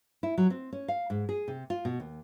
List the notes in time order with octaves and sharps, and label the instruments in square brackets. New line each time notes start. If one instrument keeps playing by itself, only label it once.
[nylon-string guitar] E4
F#3
C4
C#4
F5
G#2
G#4
C3
F4
B2
D#2